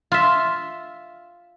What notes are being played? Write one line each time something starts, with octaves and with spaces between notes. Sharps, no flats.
F4 E5